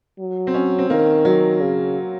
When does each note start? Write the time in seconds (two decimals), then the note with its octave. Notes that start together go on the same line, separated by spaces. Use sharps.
0.19 F#3
0.47 C4
0.54 C#4
0.79 C4
0.90 D#3 A#3
1.25 F#3
1.61 C#3